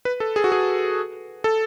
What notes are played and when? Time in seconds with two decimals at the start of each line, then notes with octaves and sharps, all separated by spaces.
0.05 B4
0.20 A4
0.36 G#4
0.44 F#4
0.52 G#4
1.44 A4